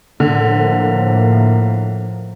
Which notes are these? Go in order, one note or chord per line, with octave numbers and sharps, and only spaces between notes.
A2 D3 F3 A#3